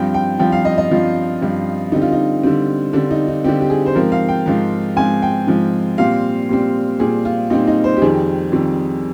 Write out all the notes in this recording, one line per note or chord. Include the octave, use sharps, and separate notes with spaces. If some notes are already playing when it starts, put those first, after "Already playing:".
Already playing: G2 F3 C4 G5
G5
G2 F3 C4 G5
F5
D#5
D#5
G2 F3 C4 F4
G2 F3 C4
D3 G3 C4 D#4
F4
D#4
D3 G3 C4
D3 G3 C4 D4
D#4
D#4
D3 G3 C4 G4
G4
G#4
C5
G#2 F3 C4 A#4
F5
G5
G#2 F3 C4
G#2 F3 C4 G#5
G5
G#2 F3 C4
A#2 G3 C4 F5
A#2 G3 C4
A#2 G3 C4 G#4
F4
A#2 G3 C4 D#4
D#4
C5
G4
F2 D#3 G3 C4 G#4
F2 D#3 G3 C4